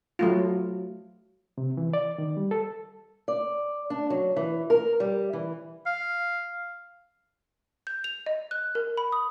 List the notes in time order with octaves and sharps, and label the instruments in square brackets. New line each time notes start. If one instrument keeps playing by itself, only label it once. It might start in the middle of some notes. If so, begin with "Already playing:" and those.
[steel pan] F#3 A3 F4
[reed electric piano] C3
E3
D5
D#3
G3
A4
[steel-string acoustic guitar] D5
D4
F#3
E3
A#4
G3
E3
[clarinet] F5
[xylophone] G6
F7
D#5
F#6
A#4
B5
D#6